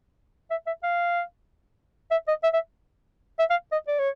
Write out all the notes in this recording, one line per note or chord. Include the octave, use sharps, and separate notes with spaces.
E5
E5
F5
E5
D#5
E5
E5
E5
F5
D#5
D5
C#5